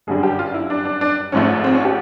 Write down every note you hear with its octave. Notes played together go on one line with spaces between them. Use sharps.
G1 F#2 D3 G3 G#4
G4
F4
E4
D4
D4
D4
G#1 G#2 F3 A3 C#4
C4
C#4
G4